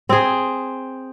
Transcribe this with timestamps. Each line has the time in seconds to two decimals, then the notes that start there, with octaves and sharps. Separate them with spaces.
0.09 C4 G#4